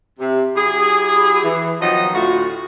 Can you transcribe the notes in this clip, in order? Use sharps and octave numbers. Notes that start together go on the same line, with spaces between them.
C3
F#3 E4 G4 G#4
E3
D#3 F3 F#3 B3 D#4 D#5
D2 A2 F4 F#4